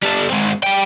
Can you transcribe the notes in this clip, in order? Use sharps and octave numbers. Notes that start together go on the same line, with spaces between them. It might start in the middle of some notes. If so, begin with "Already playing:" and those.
G3 A4
G#3 C4
G3 G5